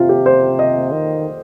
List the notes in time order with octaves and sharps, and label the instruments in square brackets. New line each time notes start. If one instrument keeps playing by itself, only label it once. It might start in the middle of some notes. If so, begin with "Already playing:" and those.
Already playing: [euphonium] C3 [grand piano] F4
[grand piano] G4
C5
D#5
[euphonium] D#3